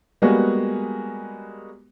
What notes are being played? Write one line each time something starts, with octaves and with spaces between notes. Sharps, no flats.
G3 G#3 A#3 B3 F#4 G#4